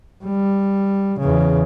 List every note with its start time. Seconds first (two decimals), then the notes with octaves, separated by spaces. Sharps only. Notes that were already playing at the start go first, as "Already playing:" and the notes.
0.24 G3
1.19 E2 C#3